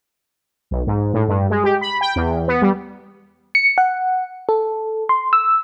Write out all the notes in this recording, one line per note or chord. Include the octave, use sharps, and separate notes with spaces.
B1
G#2
A2
G2
G#3
G4
B5
G5
E2
B3
G3
C#7
F#5
A4
C6
E6